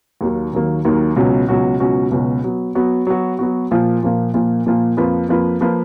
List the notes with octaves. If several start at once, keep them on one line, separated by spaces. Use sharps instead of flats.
D#2 D#3 F#3 A#3
D#2 D#3 F#3 A#3
D#2 D#3 F#3 A#3
C#2 B2 F#3 C#4 F#4
C#2 B2 F#3 C#4 F#4
C#2 B2 F#3 C#4 F#4
C#2 B2 F#3 C#4 F#4
F#3 B3 F#4
F#3 B3 F#4
F#3 B3 F#4
F#3 B3 F#4
A#2 F3 A#3 F4
A#2 F3 A#3 F4
A#2 F3 A#3 F4
A#2 F3 A#3 F4
F2 F3 A#3 F4 B4
F2 F3 A#3 F4 B4
F3 A#3 F4 B4